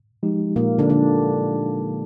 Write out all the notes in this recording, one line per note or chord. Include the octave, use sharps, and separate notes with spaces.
F3 G#3 D#4 G4
A#2 A#3
D3 D4
D3 D4